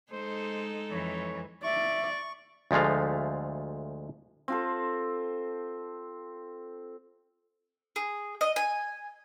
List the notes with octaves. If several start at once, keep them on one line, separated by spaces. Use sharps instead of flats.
G#3 D#4 A4 C5
F2 E3 C#5
D5 E5 C#6
D2 F3 G#3 A3 F5
C4 F4 A4
G#4
D#5
G#5